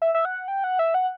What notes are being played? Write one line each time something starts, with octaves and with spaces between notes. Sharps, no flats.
E5
E5
F#5
G5
F#5
E5
F#5